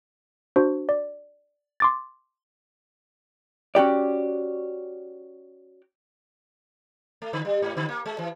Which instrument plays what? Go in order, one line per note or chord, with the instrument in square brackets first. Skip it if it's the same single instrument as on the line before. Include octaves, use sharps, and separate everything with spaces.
[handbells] D4 F#4 C5
D5
C6 D6 A6
[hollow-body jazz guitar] C#4 F#4 G4 D5
[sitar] A3
D3
G3
G#2
D3
A#3
G#3
E3